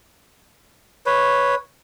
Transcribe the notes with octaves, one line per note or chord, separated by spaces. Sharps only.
B4 C#5